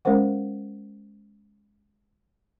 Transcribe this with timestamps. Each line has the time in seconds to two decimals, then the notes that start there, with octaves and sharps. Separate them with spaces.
0.05 G#3 C#4 A#4 C5 F#5